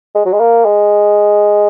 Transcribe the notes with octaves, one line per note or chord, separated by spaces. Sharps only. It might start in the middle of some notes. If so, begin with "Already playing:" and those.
G#3
F#3
G#3
A#3
G#3